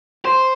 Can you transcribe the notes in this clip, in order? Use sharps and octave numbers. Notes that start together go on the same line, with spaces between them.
C5